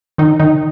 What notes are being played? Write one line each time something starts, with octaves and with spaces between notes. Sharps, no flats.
D#3 D#4
D#3 D#4